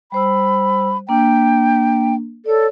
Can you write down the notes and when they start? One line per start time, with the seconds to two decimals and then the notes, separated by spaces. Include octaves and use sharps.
0.12 G3 C5 B5 E6
1.09 A#3 D4 G5
2.46 A4 C#5 D5